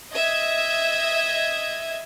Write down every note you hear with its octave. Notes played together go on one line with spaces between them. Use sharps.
D#5 E5 G#6